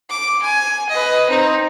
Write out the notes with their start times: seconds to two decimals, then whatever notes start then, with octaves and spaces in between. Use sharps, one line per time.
0.10 D6
0.42 G#5
0.89 B4 D#5
1.28 C4 D#4